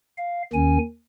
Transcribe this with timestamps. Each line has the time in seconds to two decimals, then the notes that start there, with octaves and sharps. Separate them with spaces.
0.18 F5
0.53 D#2 D#3 C#4 G#5